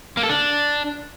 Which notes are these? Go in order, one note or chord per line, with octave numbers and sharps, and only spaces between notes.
A#3
A4
D4